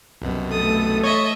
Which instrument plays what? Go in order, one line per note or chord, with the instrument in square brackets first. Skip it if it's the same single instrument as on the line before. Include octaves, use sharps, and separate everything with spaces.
[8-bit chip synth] C2 F#2 B2
[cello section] E3 A3 A4 [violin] D#6
[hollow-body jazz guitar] C#5 [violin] D#5 E5